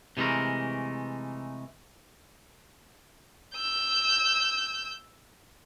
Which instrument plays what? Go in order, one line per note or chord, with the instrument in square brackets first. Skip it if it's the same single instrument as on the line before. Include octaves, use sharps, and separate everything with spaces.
[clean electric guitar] C3 E3 G#3 A3 A#4
[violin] E6 G6